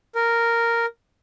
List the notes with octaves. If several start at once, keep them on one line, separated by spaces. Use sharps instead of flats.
A#4